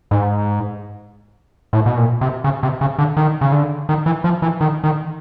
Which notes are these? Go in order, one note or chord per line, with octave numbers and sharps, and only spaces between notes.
G#2
A2
B2
A#2
C3
C#3
C3
C#3
D3
D#3
C#3
D3
D#3
E3
F3
E3
D#3
D#3